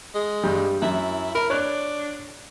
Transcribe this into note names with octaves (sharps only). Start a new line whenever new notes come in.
G#3
G2 G3
F#2 E4
A#4 B5
D4 C#5 F#6